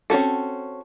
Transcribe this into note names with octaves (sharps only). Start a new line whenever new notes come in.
C4 C#4 F#4 A4